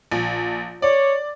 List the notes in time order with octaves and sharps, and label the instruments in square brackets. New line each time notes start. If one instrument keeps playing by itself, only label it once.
[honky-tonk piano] A#1
[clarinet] C#5 [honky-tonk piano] D5